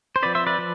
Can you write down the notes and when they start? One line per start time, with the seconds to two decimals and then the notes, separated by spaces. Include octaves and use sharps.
0.16 C5
0.23 F3 C4 B4 D5
0.35 C5 E5
0.47 B4 D5
0.58 F3